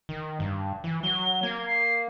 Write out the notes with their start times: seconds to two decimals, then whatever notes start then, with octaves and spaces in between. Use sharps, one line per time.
0.09 D#3
0.40 G2
0.84 E3
1.03 F#3 G7
1.43 A#3 G#6
1.67 C7